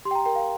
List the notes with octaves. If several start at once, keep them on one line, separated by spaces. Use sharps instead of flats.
G4 C6
G5
A#5
A#4 G5
F5